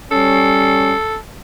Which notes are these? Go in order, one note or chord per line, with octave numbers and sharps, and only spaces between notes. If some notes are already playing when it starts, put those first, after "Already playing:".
G3 C#4 A4